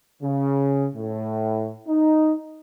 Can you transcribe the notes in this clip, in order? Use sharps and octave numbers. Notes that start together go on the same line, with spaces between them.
C#3
A2
D#4